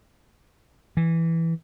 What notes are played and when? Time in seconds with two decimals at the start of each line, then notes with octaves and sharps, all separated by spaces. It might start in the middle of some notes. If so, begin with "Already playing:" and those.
0.97 E3